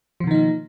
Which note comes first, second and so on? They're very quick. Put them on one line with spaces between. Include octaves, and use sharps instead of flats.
F3 B2 D#3 D#4 A#3